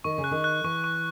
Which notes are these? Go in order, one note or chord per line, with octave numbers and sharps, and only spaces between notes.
D#3 C#6
C#3
F#6
D#3
F#6
E3 C#6
C#6